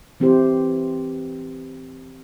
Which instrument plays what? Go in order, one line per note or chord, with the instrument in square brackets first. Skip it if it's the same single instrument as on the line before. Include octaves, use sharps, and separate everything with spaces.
[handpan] E3 C4 E4 G4 C5